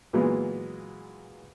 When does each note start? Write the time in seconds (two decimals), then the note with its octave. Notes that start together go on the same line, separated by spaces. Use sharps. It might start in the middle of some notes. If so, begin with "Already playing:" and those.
0.13 A#2 E3 F#3 G#3 B3 F4